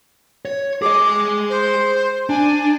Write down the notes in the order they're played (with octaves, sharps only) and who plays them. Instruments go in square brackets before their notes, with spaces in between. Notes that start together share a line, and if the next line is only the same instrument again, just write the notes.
[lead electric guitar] C#5
[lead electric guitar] G#4 D#5 [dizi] D6
[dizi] C5
[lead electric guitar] D4 [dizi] G#5